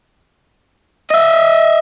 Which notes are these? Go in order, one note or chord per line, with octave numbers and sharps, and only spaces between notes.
D#5 E5